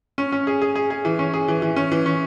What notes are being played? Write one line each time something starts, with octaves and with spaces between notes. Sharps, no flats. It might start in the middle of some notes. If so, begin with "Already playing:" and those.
C#4
C#4
G#4
G#4
G#4
G#4
E3
C#4
G#4
E3
E3
C#4
E3
C#4